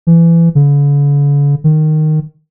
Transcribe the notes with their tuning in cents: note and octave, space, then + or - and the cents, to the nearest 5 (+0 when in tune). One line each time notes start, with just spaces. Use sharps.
E3 +25
D3 -45
D#3 -10